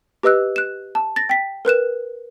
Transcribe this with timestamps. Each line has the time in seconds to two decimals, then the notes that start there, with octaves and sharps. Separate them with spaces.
0.23 G4 B4 D#5 E6 F#6
0.56 F#6 E7
0.95 A5
1.16 A6 A#6
1.29 G5 B6
1.65 A#4 B4 F#6 E7